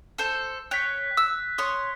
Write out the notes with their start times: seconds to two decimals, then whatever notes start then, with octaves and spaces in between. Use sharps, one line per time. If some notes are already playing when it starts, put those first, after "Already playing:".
0.18 A4 C5
0.71 C#5 G5 F#6 B6
1.17 E6
1.58 C#5 C6 D#6